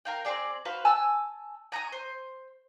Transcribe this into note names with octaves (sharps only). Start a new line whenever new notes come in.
A#4 F5 G5
C4 F#4 G#4 D5
F#4 B4 C5 F5
G#5 A5 E6
G#5 A#5 C#6 D#6
C5